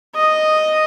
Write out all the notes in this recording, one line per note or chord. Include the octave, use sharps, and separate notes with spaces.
D#5